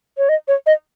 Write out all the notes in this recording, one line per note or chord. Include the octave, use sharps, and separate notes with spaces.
C#5
D#5
C#5
D#5